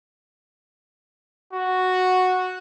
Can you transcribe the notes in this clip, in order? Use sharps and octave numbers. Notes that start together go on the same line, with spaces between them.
F#4